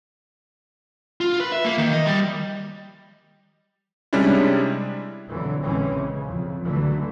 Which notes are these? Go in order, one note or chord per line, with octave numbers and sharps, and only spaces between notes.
F4
B4
E5
A#3
D#3
D#5
G3
C3 G3 G#3 C#4 D4 E4
F2 B2 D3 E3 F#3
A#1 D3 E3 G#3 C4 C#4
C#3
F2
C#2 D3 E3 F#3 A3